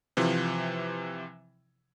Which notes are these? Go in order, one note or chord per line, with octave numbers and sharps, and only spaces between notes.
C3 E3 F3